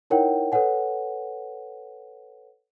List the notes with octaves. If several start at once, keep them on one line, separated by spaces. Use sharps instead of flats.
D#4 E4 A#4 C#5 F#5 G5
A4 B4 C#5 F#5 G#5